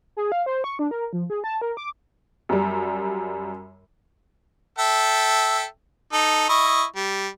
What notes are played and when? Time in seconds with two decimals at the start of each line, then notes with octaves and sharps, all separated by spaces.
0.17 G#4
0.32 F5
0.46 C5
0.64 C#6
0.79 D4
0.91 A#4
1.13 F3
1.30 G#4
1.44 A5
1.61 A#4
1.77 D6
2.49 F#2 G3
4.79 A4 E5 G5
6.13 D#4 A4
6.49 E4 D#5 C#6
6.96 G3